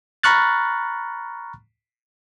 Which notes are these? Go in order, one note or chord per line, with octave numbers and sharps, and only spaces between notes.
A#5 B5 C#6 F6 F#6 A6